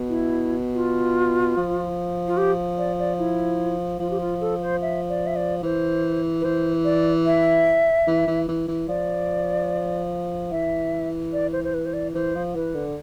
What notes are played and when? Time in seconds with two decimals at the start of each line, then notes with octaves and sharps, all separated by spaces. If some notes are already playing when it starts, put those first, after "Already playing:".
Already playing: B2
0.09 E4
0.75 F4
1.57 F3
2.27 F4
2.37 G4
2.78 D5
2.99 D5
3.18 E4
4.00 F3 F4
4.11 G4
4.21 F4
4.41 A4
4.62 C5
4.82 E5
5.09 D5
5.27 E5
5.36 D5
5.63 E3 C5
6.41 B4
6.44 E3 C5
6.85 D5
7.26 E5
8.07 E3
8.27 E3
8.48 E3
8.68 E3
8.88 F3 D5
10.51 E3 E5
11.33 D5
11.53 C5
11.64 C5
11.74 B4
11.85 C5
11.94 D5
12.14 E3 C5
12.35 F3
12.55 E3 B4
12.75 D3